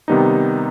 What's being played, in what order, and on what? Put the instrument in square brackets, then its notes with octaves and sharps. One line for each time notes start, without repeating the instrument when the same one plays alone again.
[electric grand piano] C3 D#3 G3 B3 D#4